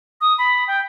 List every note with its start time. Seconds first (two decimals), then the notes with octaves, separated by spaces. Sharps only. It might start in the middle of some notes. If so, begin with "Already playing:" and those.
0.21 D#6
0.38 B5
0.68 G5